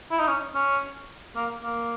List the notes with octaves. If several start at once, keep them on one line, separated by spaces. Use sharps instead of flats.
E4
D#4
C#4
C#4
A#3
A#3